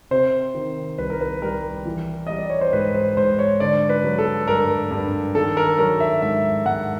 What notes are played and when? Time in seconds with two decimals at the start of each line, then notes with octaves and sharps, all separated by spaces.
0.11 C3 C5
0.55 D#3
0.98 C2 B4
1.10 A#4
1.21 B4
1.42 G3 A#4
1.85 E3
2.27 G3 D#5
2.38 D5
2.50 C#5
2.61 C5
2.73 G#2 B4
2.94 C5
3.17 G#2 C5
3.39 C#5
3.60 D3 D5
3.89 B4
4.04 F#3
4.18 A4
4.48 G2 A#4
4.91 G2
5.35 D#3 A4
5.57 A#4
5.78 F#3 A#4
6.00 E5
6.22 G#2 E5
6.66 G#2 F#5